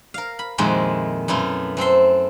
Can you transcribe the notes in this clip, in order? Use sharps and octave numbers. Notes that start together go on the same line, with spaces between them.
A#4 F5
B5
F2 A#2 D#3 G#3 E4 F#4
F#2 B2 A3 E4 F4
F#2 C4 A4 C6